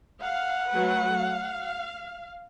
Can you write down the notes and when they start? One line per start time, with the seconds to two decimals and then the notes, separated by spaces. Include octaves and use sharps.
0.21 F5 F#5
0.71 F#3 A3 B4
1.17 F5